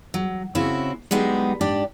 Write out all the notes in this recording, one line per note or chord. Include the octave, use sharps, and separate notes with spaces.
F#3
C#3 C4 C#4 E4 F#4
D3 F#3 G#3 B3 D#4 G4
G#2 D4 G4 D5